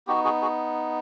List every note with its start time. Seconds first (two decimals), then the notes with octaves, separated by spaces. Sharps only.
0.07 B3 D#4 F#4 G4
0.24 F#4 G#4
0.42 F#4 G#4